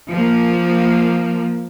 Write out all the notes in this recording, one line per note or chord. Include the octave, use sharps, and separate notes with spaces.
F3 A#3